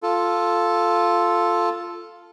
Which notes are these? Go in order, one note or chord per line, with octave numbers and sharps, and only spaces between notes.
F4 A4